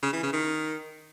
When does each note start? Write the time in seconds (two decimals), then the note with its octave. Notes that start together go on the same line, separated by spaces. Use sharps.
0.03 C#3
0.13 E3
0.23 C#3
0.33 D#3